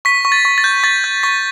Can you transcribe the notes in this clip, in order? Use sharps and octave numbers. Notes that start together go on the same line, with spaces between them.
C#6 B6
C#6
A6
C#6
A6
G6
C#6 A6
G6
C#6 B6